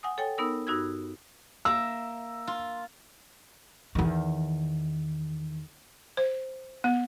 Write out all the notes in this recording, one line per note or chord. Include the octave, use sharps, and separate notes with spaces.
F#5 G#5 D#6
A4 C#5 G5 G#5
B3 D#4 A#4 E6
G2 D#4 F#4 E6 G#6
A#3 E5 E6
F4
E2 D#3
C5
B3